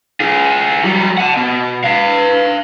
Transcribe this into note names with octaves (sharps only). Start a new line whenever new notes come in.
F4 G#4
F#3 G3
F#5 A5
B2
B4 F5